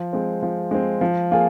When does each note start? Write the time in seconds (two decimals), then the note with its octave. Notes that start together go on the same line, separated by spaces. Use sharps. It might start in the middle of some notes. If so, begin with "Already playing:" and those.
Already playing: F3
0.13 G#3 C4
0.42 F3
0.71 G#3 C4
1.01 F3
1.31 A#3 F4 G#4